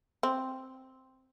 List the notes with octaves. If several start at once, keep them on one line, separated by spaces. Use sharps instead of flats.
C4